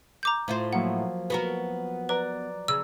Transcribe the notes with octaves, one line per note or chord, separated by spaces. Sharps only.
A#5 D6 G6
A2 F4 C5
F3 F#3 A#3 F#5
B3 F#4 A#4
B4 D5 A#5 F#6
C#3 E6